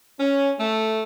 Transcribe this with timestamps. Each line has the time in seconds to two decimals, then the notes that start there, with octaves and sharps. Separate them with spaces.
0.20 C#4
0.60 A3